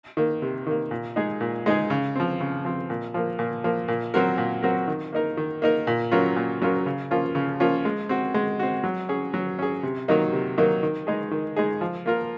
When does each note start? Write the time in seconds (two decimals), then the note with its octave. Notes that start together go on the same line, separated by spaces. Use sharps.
0.17 D#3 A#3
0.42 C3
0.67 D#3 A#3
0.91 A#2
1.16 G#3 D#4 G#4
1.41 A#2
1.66 G#3 D#4 G#4
1.90 C#3
2.16 F3 C4
2.40 C#3
2.65 F3 C4
2.90 A#2
3.14 F3 A#3
3.39 A#2
3.64 F3 A#3
3.88 A#2
4.14 F#3 C4 F#4 A#4
4.38 A#2
4.62 F#3 C4 F#4 A#4
4.88 D#3
5.13 A#3 D#4 A#4
5.37 D#3
5.62 A#3 D#4 A#4
5.87 A#2
6.11 F#3 C#4 F4 A#4
6.36 A#2
6.62 F#3 C#4 F4 A#4
6.86 C#3
7.11 F3 A#3 C#4 F4
7.35 C#3
7.60 F3 A#3 C#4 F4
7.85 G#3
8.09 C4 F#4
8.34 G#3
8.59 C4 F#4
8.84 F#3
9.09 C#4 G#4
9.34 F#3
9.59 C#4 G#4
9.83 C3
10.08 D#3 F#3 A#3 D#4
10.32 C3
10.58 D#3 F#3 A#3 D#4
10.83 D#3
11.07 G#3 D#4 G#4
11.31 D#3
11.56 G#3 D#4 G#4
11.81 F3
12.06 A#3 F4 A#4